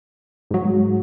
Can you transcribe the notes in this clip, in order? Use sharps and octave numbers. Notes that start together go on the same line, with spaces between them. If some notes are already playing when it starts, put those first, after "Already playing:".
G#2 F#3
G#3